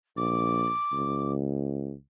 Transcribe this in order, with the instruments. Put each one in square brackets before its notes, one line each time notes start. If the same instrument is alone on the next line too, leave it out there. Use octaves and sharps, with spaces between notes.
[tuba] A#1 [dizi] D6
[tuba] C#2